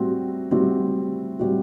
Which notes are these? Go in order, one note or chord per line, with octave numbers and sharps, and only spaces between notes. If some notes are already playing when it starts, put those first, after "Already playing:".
Already playing: A2 G3 C4 F#4
A2 G3 C4 F#4
A2 G3 C4 F#4